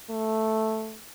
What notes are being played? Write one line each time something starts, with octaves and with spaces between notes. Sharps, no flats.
A3